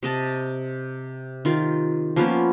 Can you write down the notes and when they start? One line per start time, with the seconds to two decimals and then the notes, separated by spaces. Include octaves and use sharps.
0.03 C3 D#5 A5
1.45 D#3 F4
2.16 F3 A#3 B3 C#4